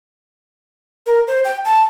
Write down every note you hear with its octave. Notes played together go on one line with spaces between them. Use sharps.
A#4
C5
G5
A5